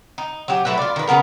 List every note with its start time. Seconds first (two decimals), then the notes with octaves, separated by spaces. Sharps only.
0.18 D#4
0.48 F#3 G4
0.65 F#3 A3 E4 B4
0.78 F4 D5
0.96 D#3 B4
1.08 C#3 G#3 B3 A#4